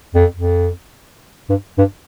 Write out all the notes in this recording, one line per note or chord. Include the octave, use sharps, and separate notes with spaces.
F2
F2
G2
G2